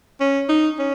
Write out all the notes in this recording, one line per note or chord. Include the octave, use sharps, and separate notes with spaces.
C#4
D#4
C#4